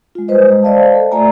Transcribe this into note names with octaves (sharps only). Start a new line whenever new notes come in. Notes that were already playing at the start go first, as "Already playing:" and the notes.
G#3 F4
G3 B4 C5 D#5
G#3
C5 D5 D#5 F5 A5
A4
A3 F4 D5 E5 G#5 A#5